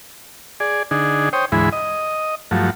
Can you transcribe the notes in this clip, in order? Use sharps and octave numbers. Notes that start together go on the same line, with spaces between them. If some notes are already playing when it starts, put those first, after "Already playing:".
G#4 D5
D3 D4 D#4 G#4
C5 C#5 G5 D#6
D2 G#2 E3 G#3 E4 B5
D#5
G2 F3 F#3 A3